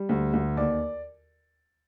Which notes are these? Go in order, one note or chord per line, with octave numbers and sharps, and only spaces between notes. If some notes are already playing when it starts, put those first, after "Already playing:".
Already playing: G3
D2
D2
D#2 D5